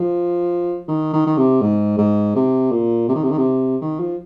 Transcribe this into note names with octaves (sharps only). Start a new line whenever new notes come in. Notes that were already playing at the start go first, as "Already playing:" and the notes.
Already playing: F3
D#3
D#3
D#3
C3
G#2
G#2
C3
A#2
C3
D#3
C3
D#3
C3
D#3
F3